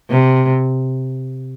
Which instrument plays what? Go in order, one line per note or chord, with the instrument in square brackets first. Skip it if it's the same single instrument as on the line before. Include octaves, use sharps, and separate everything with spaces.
[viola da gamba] C3